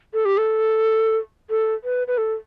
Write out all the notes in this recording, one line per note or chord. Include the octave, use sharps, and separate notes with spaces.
A4
G4
A4
A4
B4
B4
A4